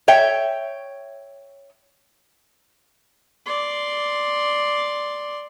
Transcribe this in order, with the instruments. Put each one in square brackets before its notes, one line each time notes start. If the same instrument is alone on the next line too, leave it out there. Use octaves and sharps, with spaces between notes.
[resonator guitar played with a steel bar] C#5 E5 G5
[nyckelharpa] D5 C6